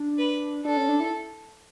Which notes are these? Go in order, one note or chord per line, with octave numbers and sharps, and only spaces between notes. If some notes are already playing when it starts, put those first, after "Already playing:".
Already playing: D4
B4
D4 A4
C#4
D4
E4